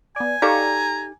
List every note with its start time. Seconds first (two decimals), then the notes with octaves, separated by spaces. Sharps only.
0.16 B3 D5 G#5
0.42 D#4 G4 A4 D5 F5 A#5 C#6